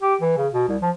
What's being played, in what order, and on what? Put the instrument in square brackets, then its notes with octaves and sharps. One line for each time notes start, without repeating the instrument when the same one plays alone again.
[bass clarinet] G4
E3
C#3
B2
C2
F3